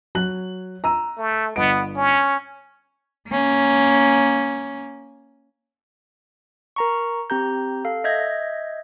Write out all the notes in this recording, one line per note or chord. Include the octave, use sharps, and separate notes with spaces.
F#3 F#6 F#7
A#5 E6 D#7
A3
G1 B3 D#5 D7
C#4
A#3 C#4
A#4 A#5 C#6
C4 G4 A#5 G6
A4 F5
D#5 E5 G6 G#6 A#6